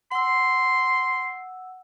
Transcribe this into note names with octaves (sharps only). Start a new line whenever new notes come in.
F#5 C6 E6